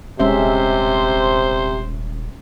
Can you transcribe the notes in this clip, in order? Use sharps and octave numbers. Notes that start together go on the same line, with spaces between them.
D#1 C3 G#3 C#4 C5 E5